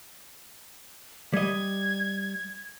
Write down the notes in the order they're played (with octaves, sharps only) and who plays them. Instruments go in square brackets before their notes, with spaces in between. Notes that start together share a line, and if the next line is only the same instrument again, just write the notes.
[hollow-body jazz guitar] G3 D#5 [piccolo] G#6